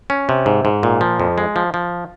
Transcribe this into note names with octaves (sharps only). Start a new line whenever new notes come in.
C#4
C3
G#2
G#2
A#2
F3
F2
G#3
F3
F3